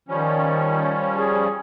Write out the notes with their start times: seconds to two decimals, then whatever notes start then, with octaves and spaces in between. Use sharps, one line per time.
0.09 D#3 F3 G3 C#4
1.17 G#4